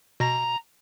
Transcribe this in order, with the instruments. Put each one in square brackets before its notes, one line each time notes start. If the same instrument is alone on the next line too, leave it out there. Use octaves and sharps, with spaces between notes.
[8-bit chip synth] B2 A#6 [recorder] A#5